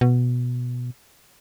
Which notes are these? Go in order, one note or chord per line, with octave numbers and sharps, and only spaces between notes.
B2